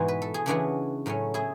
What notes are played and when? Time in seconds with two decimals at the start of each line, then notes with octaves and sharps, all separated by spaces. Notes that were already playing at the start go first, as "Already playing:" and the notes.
Already playing: G#2 B2 E3 G#3 F#4
0.08 B4
0.22 A4
0.34 G#4
0.46 C#3 E3 G#3 B3 D4 F#4
1.06 A2 F#3 A3 C#4
1.34 E4 G#4